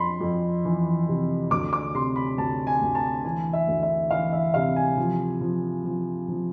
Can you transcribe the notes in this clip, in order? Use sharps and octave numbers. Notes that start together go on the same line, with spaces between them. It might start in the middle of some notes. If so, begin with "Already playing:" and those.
Already playing: F2 B5 C6
F2
E3
C3
D2 D6
D6
C3 C6
B5
D2 A5
G#5
D2
A5
E3 G#5
E5
D2
E5
E3 F5
E5
C3 F5
G#5
F3
F3
F3
F3